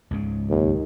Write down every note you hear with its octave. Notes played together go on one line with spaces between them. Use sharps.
C#2 G#2 C#3
D#2